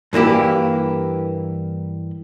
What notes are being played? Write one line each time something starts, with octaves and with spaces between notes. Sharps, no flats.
G2 E3 A#3 E4 G4